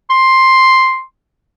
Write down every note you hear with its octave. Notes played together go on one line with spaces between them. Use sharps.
C6